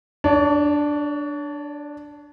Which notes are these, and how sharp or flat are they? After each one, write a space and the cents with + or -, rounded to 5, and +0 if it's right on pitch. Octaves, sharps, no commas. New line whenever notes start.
D4 +0 C#5 +40